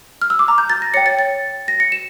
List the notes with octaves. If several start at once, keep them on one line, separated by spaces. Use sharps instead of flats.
F6
E6
D6
A#5
G6
A6
A#6
C#5 G5 C#7
A6
A6
A#6
C#7
E7